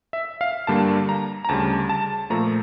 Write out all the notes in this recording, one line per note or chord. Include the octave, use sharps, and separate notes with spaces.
E5
F5
G2 D3 G3 A#3 A5
A#5
A#5
D2 C#3 G3 A5
A5
A#2 F3 A3 A#5